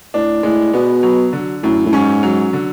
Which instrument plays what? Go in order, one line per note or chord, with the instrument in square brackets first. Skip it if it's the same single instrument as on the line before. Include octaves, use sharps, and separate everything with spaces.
[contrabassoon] A2 [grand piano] D4
[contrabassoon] A2 [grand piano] G#3
[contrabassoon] B2 [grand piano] B3
[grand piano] F#3
D3
[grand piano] F#2 [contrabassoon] A2
[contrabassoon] A2
[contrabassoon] G#2 [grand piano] C#4
[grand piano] F#3
D3